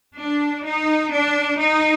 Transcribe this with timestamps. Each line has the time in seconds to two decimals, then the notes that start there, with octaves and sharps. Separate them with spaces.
0.17 D4
0.65 D#4
1.11 D4
1.58 D#4